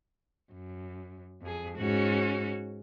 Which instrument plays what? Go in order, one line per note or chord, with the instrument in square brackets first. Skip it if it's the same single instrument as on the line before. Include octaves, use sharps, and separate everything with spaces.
[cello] F#2
F2 G#4
[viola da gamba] G#2 [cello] C#4 F#4